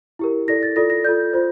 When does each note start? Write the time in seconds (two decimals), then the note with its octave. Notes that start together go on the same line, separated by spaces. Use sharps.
0.19 E4 G4 A#4
0.48 E4 A4 D5 A#6
0.63 A6
0.76 F4 A4 D5 A#6
0.90 A#6
1.04 F4 A4 D5 G6
1.33 F4 C5